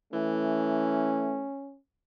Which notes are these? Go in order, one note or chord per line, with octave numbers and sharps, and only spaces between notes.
E3 A3 C#4